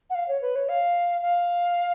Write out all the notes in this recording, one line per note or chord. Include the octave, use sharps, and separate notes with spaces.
F#5
F5
C#5
B4
C#5
F5
F5